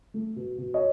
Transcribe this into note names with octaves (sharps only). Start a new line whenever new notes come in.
A3
B2
B2
C#5 D#5